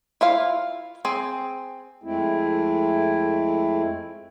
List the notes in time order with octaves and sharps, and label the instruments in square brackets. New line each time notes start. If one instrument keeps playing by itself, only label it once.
[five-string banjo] E4 F4 F5
C4 G#4
[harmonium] F2 G#3 A3 C4 E4